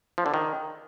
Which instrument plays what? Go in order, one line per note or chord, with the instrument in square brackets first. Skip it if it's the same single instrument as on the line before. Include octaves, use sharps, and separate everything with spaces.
[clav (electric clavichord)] F3
D3
D#3